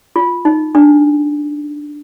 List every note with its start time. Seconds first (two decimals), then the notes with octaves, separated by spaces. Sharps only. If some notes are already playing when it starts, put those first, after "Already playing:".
0.16 F4
0.45 D#4
0.75 D4